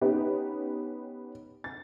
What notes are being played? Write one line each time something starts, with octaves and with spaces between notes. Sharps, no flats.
B3 C#4 D#4 G4
A6